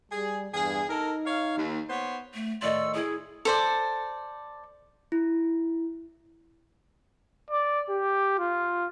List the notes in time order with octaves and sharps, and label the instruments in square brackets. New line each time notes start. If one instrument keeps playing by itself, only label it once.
[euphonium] G3 [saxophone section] G#4
[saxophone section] E2 G#4 [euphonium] G2
[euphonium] D#4 [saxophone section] A4 A#4
[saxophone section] C#5 F5
D#2
B3 C5 C#5
[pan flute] A3
[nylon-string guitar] A2 D#3 D#5 [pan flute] D5 [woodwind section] C6 C#6 E6
[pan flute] E4 [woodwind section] G#4
[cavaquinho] A4 C5 D5
[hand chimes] E4
[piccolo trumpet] D5
G4
F4